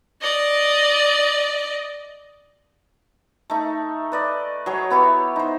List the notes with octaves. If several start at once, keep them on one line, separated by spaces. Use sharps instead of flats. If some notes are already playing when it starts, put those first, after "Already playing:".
D5 D#5
A3 D#4
B4 D5 D#5
F#3 G#4 C#5
B3 E4 G4 C#6
D#4 C5